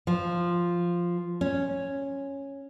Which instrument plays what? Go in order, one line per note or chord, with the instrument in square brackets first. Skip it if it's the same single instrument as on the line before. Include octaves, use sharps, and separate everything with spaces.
[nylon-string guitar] F3
C#4